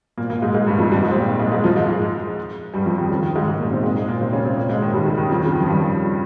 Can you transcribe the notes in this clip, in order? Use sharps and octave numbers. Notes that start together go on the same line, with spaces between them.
A#2 A#3
A#2 A#3
G#2 G#3
G#2 G#3
G2 G3
F2 F3
G2 G3
G#2 G#3
C4
A#2 A#3
G#2 G#3
G#2 G#3
F2 F3
G#2 G#3
G#2 G#3
G2 G3
F2 F3
D#3
C#3
D#3
G#2 G#3
G#2 G#3
A#2 A#3
C3 C4
G#2 G#3
G#2 G#3
A#2 A#3
C3 C4
C#3 C#4
C3 C4
A#2 A#3
G#2 G#3
D#3
G2 G3
C#3
D#3
F2 F3
C#3
D#3
F3
G2 G3